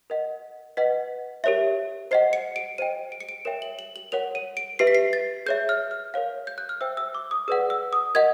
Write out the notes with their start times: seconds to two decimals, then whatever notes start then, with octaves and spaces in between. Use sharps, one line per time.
0.10 A#4 D#5 F#5
0.77 B4 D#5 F#5 B6
1.44 G4 A#4 C#5 E5
2.11 C5 D#5 F#5 C7
2.33 C#7
2.56 D7
2.78 C5 D#5 G5 D#7
3.12 D7
3.21 C#7
3.29 D7
3.45 A#4 C#5 E5 G5 E7
3.62 F#7
3.79 F#7
3.96 F#7
4.12 A#4 C#5 F#5 F7
4.35 D#7
4.57 D7
4.79 G4 B4 E5 C7
4.87 B6
4.95 C7
5.13 A6
5.46 G#4 C#5 E5 G6
5.69 F6
5.91 F6
6.14 A#4 C#5 F5
6.47 G6
6.58 F#6
6.69 F6
6.81 C5 E5 G5 E6
6.97 E6
7.15 D6
7.31 D#6
7.48 G#4 B4 D5 F#5 E6
7.70 E6
7.93 D#6
8.15 A#4 D#5 F#5 G#6